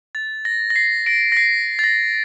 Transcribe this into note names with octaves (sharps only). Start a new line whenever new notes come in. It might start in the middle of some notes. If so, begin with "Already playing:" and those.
A6
A#6
A#6
C7
A#6 D7
A#6
C7
A6
A#6